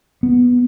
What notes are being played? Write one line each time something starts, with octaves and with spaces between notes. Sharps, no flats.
B3